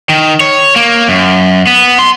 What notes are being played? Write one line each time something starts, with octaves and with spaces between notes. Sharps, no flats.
D#3
C#5
A#3
F#2
B3
C6